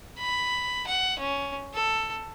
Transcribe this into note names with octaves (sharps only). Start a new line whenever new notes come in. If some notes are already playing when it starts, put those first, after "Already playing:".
B5
F#5
C#4
A4